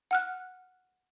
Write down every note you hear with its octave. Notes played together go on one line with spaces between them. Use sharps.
F#5 F6 F#6